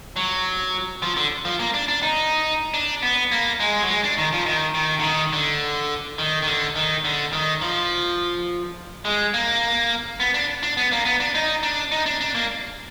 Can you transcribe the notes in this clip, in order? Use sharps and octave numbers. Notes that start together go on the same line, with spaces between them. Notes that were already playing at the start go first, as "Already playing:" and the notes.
F#3
F3
D3
F3
A#3
D4
D4
D#4
D4
B3
A#3
G#3
F#3
G#3
D4
D#3
F3
D#3
D#3
D3
D#3
D3
D#3
D#3
D3
D#3
D3
D#3
F3
G#3
A#3
B3
D4
D4
B3
A#3
B3
D4
D#4
D4
D#4
D4
D4
A#3